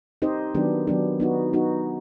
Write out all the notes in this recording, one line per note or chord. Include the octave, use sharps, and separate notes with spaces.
C4 D#4 G4 C5 D#5
D#3 F#3 B3 D4 G4
D#3 F#3 B3 D4 G4
B3 D#4 F#4
B3 D#4 F#4